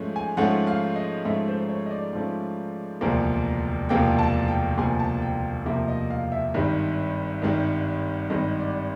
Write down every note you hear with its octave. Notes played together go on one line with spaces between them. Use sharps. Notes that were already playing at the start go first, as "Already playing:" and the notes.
Already playing: G#2 F3 A3 C#4
G#5
G#2 F3 A3 C#4 F#5
F5
D#5
G#2 F3 A3 C#4 E5
C5
C#5
D#5
D5
G#2 F3 A3 C#4
E1 D2 C3 F3 A#3
E1 D2 C3 F3 A#3 G5
A5
G5
E1 D2 C3 F3 A#3 G#5
A5
G5
E1 D2 C3 F3 A#3 E5
D#5
F5
E5
G#1 G2 D#3 G3
G#1 G2 D#3 G3
G#1 G2 D#3 G3 D#5
D5